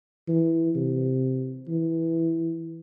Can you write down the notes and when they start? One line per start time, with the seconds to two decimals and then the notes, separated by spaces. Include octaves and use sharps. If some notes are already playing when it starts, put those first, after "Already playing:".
0.28 E3
0.76 C3
1.68 E3